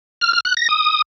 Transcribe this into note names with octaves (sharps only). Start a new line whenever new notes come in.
F6
F6
F#6
A#6
D#6